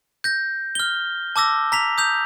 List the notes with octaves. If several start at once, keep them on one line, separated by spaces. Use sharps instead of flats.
G6 A#6
F6 G7
A5 D6 E6 A#6
A#5 B6 F7
D#6 G6 F7